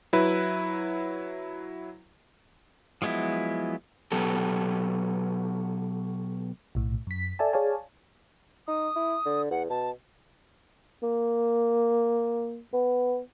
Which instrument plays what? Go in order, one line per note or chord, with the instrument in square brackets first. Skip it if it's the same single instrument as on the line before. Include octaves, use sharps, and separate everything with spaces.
[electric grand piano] F#3 E4 B4
[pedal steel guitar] F3 F#3 G#3 B3 E4
[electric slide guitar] B2 F#3 B3 G4 A4
[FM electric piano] B1 A2
F#2 B6
A4 D5 E5 G#5 A5
G#4 C#5 D5 F5 G#5 A5
[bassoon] D#4 [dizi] D#6
[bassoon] E4
D3
[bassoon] E2 [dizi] F#5
[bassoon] B2 [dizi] A5
[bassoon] A#3
B3